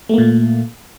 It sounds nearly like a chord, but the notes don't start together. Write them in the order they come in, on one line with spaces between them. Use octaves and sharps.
A3 A#3 A#2